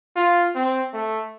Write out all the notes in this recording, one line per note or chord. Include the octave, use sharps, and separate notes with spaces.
F4
C4
A3